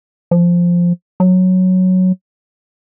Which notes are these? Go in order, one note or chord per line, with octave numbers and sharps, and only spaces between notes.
F3
F#3